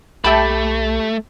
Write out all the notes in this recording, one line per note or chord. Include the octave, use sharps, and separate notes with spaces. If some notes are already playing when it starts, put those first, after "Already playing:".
B1 A3 G4 E5 G5 A5 B5